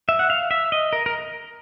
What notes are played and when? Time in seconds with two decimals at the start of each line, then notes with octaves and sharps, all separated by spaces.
0.09 E5
0.19 F#5
0.30 F5
0.51 E5
0.72 D#5
0.93 A#4
1.06 A#4